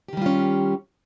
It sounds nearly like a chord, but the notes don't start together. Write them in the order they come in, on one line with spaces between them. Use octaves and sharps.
G4 D#3 G3 F4 C#4